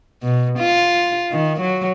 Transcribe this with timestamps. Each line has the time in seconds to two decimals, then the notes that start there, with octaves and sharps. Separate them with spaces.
0.23 B2
0.59 F4
1.32 D#3
1.60 F#3